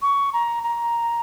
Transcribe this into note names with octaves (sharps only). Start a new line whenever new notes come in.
C#6
A#5
A#5